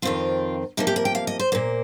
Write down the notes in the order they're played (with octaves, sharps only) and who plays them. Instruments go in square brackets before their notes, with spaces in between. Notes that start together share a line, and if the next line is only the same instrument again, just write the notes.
[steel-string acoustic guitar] F2 D#3 C4 F4
C3 F3 A#3 D#4
G4
A#4
G5
F5
D#5
C5
A#2 A#3 C5